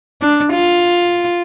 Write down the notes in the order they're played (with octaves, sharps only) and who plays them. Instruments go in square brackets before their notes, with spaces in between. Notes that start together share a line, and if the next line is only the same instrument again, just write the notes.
[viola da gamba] D4
F4